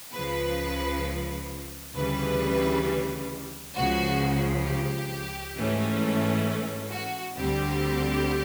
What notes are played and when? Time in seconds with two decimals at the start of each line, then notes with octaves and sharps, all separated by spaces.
0.14 C#2 C#3 F3 B4
1.95 D2 C#3 E3 G3 B4
3.76 C#2 C#3 F3 F#4
4.66 G4
5.57 G#2 E3 A3 C#4
6.92 F#4
7.37 D2 D3 G3 C4 G4